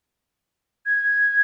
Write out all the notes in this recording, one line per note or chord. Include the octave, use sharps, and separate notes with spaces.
G#6